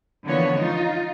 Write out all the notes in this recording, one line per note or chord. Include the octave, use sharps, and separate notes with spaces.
D3 E3 F3 A#3 B3 C#5
D#4 F4